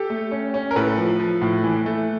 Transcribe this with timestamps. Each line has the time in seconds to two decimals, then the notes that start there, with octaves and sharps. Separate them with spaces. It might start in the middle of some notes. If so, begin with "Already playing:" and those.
Already playing: G4 A4
0.10 A3
0.31 C#4
0.54 C#4
0.71 A#4
0.76 A2 A4 B4
0.98 F3
1.19 F3
1.42 A2
1.64 E3
1.86 A3